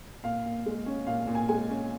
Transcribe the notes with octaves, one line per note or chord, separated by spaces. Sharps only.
A#2 F5
A#2
G#3
C#4
A#2 F5
A#2
G#5
G#3 G#5
C#4